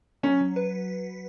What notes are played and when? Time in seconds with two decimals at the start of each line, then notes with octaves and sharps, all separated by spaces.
0.23 F#3 C#4
0.41 F#3
0.56 B4